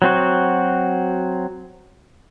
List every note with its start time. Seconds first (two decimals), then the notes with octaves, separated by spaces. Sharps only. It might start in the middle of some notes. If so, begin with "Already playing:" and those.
0.02 F#3 C4 F#4